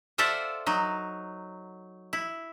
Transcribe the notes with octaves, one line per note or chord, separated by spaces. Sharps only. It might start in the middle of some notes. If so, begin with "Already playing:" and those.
F4 A4 C5 D5 E5 F#5
F#3 D#4
E4